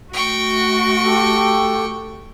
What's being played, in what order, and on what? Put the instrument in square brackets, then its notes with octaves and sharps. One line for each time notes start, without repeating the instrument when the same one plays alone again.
[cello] A3 F#4 [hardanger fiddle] G5 C#6
[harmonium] G4 A4